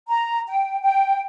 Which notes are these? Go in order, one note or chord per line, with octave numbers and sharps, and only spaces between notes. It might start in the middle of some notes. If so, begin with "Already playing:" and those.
A#5
G5
G5